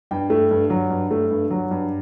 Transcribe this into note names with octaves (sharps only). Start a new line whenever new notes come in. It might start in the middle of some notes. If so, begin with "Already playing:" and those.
G2 G5
A3
G2
F#3
G2
A3
G2
F#3
G2